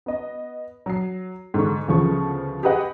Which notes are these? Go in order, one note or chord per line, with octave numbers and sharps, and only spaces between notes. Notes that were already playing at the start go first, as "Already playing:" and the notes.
B3 D#5
F#3 C7
G#2 D3 C#6
D2 C#3 F3 B3 C#6
G4 G#4 B4 D#5 F#5